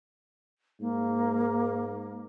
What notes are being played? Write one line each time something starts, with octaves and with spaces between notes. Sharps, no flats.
G#2 A#3